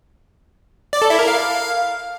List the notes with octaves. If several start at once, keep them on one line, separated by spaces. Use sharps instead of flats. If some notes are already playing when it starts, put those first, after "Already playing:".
D5
A4
E4
A#4
F5